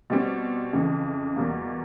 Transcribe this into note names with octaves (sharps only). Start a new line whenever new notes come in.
B2 G3 C4
F2 C#3 E3
E2 B2 G3 A#3